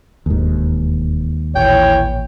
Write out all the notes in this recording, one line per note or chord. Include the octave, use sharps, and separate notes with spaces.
E1 D#2 G#2
A1 A#2 E3 C#5 G5